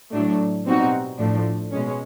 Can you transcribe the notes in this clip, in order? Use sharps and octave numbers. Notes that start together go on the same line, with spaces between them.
A2 F#3 A3 D4
B2 G3 C4 D#4 F#4
A2 F3 A3 D4
B2 G#3 C#4